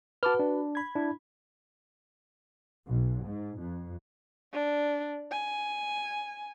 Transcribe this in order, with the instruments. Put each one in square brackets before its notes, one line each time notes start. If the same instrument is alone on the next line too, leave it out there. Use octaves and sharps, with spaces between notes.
[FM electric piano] F#4 B4 [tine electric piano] A5 D6 F6
[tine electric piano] D4
[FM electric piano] B5 G#6
[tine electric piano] D4 E4
[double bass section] B1
G#2
F2
[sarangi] D4
G#5